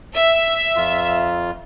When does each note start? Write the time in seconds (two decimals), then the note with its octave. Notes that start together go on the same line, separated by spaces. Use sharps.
0.14 E5
0.76 F2 F4